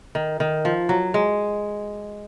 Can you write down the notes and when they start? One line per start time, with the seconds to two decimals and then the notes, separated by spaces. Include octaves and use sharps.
0.15 D#3
0.40 D#3
0.65 F3
0.89 F#3
1.14 G#3